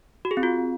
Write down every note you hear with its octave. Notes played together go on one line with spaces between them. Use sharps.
F#4
G#4
C4
F4